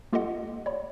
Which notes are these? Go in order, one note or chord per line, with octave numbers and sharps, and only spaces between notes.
A#3 F4 G4 A4 D#5 F#5
C#5 D5 B5